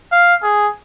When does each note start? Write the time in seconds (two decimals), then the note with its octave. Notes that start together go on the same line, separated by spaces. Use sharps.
0.12 F5
0.42 G#4